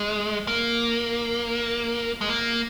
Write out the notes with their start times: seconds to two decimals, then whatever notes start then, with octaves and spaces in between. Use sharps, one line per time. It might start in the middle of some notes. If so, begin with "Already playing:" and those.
Already playing: G#3
0.47 A#3
2.21 G#3
2.29 A#3